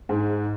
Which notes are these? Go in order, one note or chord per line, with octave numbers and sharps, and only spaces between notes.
G#2